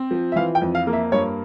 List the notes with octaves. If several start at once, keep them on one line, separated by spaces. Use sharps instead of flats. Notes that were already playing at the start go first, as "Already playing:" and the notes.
Already playing: C4
F3
E5
E3 F5
G5
F2
F5
A#3
E5
G2 C#5